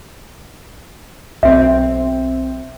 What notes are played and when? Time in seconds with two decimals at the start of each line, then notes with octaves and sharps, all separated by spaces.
1.43 B1 C4 E5